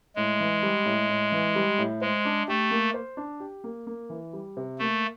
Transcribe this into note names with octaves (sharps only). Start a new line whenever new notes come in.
A2 G#3
E3
G3
A2
A2
E3
G3
A2
G#3 C5
D4
A3 G4
A#3
C5
D4
G4
A#3
A#3
E3
G3
C3
A3 A#3